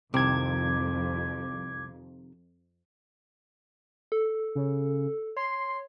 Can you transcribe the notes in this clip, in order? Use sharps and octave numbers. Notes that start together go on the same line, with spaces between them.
C2 F2 C3 D#3 C4 D6 G#6
A4
C#3
C#5 C6